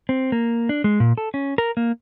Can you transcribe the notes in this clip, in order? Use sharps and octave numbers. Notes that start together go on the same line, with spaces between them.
C4
A#3
D4
G#3
A#2
A4
C#4
A#4
A#3